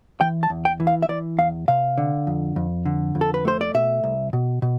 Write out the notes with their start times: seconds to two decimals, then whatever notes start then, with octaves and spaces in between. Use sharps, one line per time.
0.21 E3 G5
0.43 A5
0.50 E2
0.65 G5
0.80 E3
0.87 F5
1.02 E5
1.09 E3 D5
1.38 E2 F5
1.68 C3 F5
1.98 D3
2.27 F2
2.56 F2
2.86 D3
3.15 F2
3.21 A4
3.34 B4
3.45 A3 C5
3.61 D5
3.74 B2 E5
4.04 C2
4.33 B2
4.62 B2